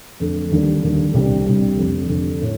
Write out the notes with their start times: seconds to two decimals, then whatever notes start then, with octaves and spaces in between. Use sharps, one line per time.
0.20 F2 D3 A3
0.52 D#2 D3 G3 A#3 D4
0.83 D#2 D3 G3 A#3 D4
1.14 C2 C3 G3 D4
1.46 C2 C3 G3 D4
1.77 F1 F2 D3
2.08 F1 F2 D3
2.40 A2 A3